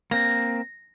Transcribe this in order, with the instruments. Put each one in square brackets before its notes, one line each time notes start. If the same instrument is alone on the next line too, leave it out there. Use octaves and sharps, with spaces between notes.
[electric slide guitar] A#3 C4 [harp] A#6